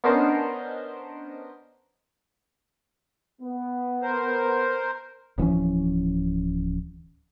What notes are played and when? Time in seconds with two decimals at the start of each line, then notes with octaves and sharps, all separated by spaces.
0.04 B3 C#4 D4 A#4 C5 D#5
3.42 B3
4.02 A#4 C5
5.38 D1 E3 F3 C#4